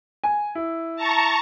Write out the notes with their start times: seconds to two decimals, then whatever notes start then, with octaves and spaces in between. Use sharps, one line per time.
0.24 G#5
0.55 E4
0.96 A5 A#5 C#6